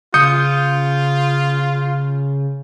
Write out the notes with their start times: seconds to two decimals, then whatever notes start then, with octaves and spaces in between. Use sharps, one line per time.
0.14 C#3 F4 D#6 G6 C#7